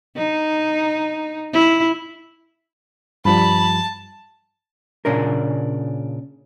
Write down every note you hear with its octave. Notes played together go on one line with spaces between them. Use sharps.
D#4
E4
G2 F3 G3 A5 B5
A#2 C#3 C#4 D4 A#4